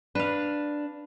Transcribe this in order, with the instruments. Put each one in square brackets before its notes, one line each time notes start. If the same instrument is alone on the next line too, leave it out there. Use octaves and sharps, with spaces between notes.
[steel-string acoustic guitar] D4 [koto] B4 F5